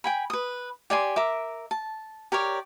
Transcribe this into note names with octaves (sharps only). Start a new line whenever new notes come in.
G5 G#5 B5
B4 D#6
G4 D5 G#5 C6
A#4 E5 D6
A5
G4 A#4 C#5 D5